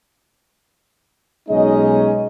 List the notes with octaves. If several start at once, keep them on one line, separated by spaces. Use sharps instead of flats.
B1 G#3 C#4 D#4 D#5